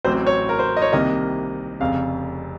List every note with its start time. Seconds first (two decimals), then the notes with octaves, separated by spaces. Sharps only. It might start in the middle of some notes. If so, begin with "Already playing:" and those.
0.05 A1 A2 F#3 C4 C5
0.27 C#5
0.49 A#4
0.59 C5
0.77 D#5
0.82 C#5
0.92 C2 C3 D#3 A#3 D#5
1.80 F1 F2 C#3 F5